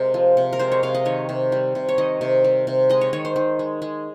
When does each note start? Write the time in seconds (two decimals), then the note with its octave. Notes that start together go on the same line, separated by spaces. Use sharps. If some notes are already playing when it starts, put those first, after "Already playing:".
Already playing: C3 G#3 A#4 C5
0.14 F3
0.37 C3
0.53 A#4
0.59 G#3 C5
0.72 C#5
0.83 C3 F5
0.95 D#5
1.05 D#3 C#5
1.29 C3
1.52 G3
1.75 C3
1.89 C#5
1.98 D#3 D#5
2.21 C3
2.44 G3
2.67 C3
2.90 G#3 D#5
3.01 C#5
3.13 D#3 C#5
3.25 C5
3.36 D#3
3.59 G#3
3.82 G#3